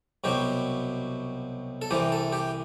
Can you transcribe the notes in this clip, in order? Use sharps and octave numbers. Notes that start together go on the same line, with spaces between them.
C2 B2 F#3 G4
A4
C2 C3 E3 G4
A4
G4